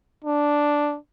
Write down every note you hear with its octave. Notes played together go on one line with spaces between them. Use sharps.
D4